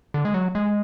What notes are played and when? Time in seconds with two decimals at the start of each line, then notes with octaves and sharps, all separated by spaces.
0.14 D3
0.25 G#3
0.34 F#3
0.55 G#3